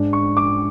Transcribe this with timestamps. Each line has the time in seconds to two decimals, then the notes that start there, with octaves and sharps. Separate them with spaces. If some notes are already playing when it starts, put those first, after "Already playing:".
Already playing: G#2 G#3 D4
0.13 C#6
0.37 D6